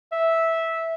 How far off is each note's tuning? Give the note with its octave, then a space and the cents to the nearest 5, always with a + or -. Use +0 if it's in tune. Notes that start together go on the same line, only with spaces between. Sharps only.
E5 -10